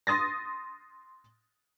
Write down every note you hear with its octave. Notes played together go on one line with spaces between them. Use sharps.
C6 D#6 A6 A#6